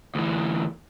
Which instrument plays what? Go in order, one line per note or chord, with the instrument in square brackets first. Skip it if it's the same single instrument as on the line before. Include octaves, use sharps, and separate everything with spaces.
[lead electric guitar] D2 E3